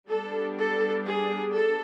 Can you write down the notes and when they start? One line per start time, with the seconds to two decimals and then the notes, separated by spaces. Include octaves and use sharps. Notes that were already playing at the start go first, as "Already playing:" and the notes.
0.11 G3 B3 D4 A4
0.58 A4
1.06 G#4
1.53 A4